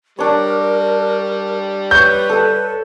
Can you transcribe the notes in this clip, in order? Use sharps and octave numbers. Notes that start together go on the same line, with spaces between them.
G3 D4 A#4 C#5
B4 C#5 G6
A4 E6